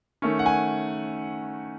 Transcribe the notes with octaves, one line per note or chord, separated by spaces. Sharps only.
D#3 A3 C#4
F#5
G#5